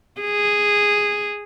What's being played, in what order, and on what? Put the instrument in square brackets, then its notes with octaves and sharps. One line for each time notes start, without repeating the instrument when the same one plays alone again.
[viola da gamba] G#4